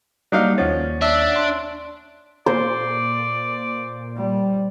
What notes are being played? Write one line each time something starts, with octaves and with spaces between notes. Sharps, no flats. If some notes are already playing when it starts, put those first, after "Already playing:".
F#3 G3 A#3 D4 D#4 F5
D#2 F3 C#4 F#5 A6
D4 E5
C6
A#2 C5 D5
G3